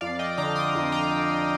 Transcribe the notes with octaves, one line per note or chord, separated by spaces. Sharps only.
F2 D5 F5
D#5 G5
D3 A#5 D6
C6 D#6
F2
G5 A#5